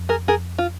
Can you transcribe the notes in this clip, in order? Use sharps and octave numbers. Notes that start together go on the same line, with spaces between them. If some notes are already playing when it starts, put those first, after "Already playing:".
Already playing: F2
G#4 A#4
F2 G#4 A#4
F4